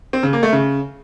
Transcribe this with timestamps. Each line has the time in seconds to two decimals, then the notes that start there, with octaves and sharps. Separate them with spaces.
0.13 C4
0.23 C#3
0.33 A#3
0.43 A3
0.53 C#3